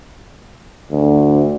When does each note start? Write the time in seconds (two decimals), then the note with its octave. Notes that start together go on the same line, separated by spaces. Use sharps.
0.91 D2